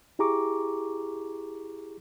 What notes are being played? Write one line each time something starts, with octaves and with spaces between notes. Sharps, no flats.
E4 G4 G#4 A#5 C#6 D6